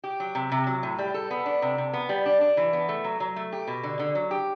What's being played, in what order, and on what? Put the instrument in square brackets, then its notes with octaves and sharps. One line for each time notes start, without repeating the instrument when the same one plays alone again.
[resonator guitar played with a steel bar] G4
F#3
C3
C3
F#3
A2
G3
A4
B3
D4
C3
C3
B3
G3
D4
D4
E3
B3
A3
F#3
F#3
A3
G4
B2
D3
D3
F#3
G4